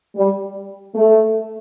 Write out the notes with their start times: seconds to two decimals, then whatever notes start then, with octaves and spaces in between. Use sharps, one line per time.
0.15 G3
0.94 A3